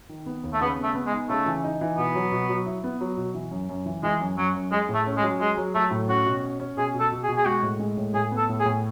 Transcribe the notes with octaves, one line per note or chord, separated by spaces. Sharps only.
D#3
B3
D#2
A3
C#3 B3
B3
A3
B3
G#3
D#4
C#3 A3
E3
D#4
E3
B2 B3
F#3
B2
F#3
E4
B3
F#3
B2
E3
F#2
F#2
E3
E3 G#3
F#2
F#2 F#3
F#2
G#3 G#4
A2
A3
C#4
G#3
F#3
G#3 G#4
F#3
F#3 A3
A2
C#4 F#4
B2
C#4
C#4
B2 G#4
B2
A4
B2
G#4
B2
G#4
G#3 F#4
A2
G#3
A2
A2 G#4
B3
A4
A2
G#4
A2